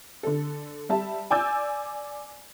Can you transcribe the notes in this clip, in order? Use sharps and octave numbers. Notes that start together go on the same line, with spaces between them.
D3 A4
G3 E5 A5
D5 G#5 D6 E6 G6 A6